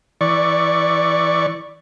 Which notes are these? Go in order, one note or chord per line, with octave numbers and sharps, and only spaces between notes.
E3 D5 C#6